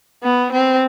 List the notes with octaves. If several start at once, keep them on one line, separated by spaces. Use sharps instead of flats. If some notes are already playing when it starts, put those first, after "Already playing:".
B3
C4